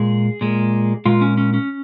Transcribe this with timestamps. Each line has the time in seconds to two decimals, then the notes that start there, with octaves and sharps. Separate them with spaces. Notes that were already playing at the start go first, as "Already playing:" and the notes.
Already playing: A#2 G#3 G#4
0.41 A#2 G#3
1.05 A#2 G#3 F4
1.21 C#4
1.37 C#4
1.54 C#4